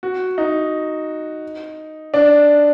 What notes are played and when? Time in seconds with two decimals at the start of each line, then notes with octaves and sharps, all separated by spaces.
0.03 F#4
0.38 D#4
2.14 D4